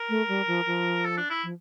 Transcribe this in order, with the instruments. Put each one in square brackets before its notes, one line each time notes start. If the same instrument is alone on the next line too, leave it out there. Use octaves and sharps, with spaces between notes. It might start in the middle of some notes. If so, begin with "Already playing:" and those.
Already playing: [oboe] A#4
[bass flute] A3
G3
F3
F3
[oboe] A4
D4
E4
[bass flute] F3